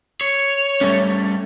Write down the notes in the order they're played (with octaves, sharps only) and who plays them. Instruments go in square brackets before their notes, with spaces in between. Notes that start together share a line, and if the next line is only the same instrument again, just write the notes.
[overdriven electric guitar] C#5
[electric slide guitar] G3 A3 C#4